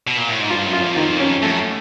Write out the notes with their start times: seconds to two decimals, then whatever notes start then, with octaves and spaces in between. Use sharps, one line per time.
0.07 B2
0.17 A#2
0.29 A2
0.39 G#2
0.50 G2 F4
0.66 F#2
0.73 F4
0.81 F2
0.96 D#3
1.20 C#4
1.42 F#2 A3